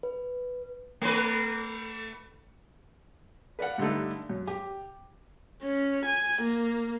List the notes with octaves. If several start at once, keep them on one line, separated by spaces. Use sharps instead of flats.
B4
A3 B4
B4 D5 F5 F#5
G2 D3 G3 A3 D#4
F#2
G4
C#4
G#5
A#3